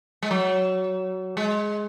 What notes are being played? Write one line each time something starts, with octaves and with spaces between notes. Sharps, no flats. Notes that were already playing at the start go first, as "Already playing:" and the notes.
G#3
F#3
G#3